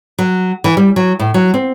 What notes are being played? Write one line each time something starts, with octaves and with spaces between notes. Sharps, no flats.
F#3
E3
G3
F#3
A2
F#3
C4